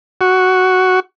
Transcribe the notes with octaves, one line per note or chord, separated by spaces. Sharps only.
F#4